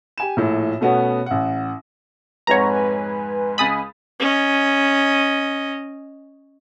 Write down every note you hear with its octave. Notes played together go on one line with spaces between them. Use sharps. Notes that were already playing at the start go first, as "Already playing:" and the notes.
G4 G#5 E7
A#1 A2
B2 A3 B3 C#4 F#4
A1 F#5
F2 G#2 B4 C#5 F#5 G#5 A#5
C#2 G#5 B5 D#6 A6
C#4 D#5